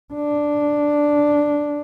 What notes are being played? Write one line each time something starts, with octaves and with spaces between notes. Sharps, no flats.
D4